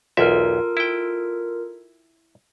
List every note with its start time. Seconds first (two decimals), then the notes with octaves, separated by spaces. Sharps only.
0.17 B1 E2 F4 A4 A#4 E5
0.77 E4 G5